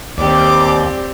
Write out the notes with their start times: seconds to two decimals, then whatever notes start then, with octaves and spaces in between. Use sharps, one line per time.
0.18 D#2 C4 G4 D5 D6